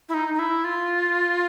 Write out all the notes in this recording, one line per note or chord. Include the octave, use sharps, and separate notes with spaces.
E4
D#4
D#4
E4
F4